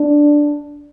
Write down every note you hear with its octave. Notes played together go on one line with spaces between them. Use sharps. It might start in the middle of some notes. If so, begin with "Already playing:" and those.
Already playing: D4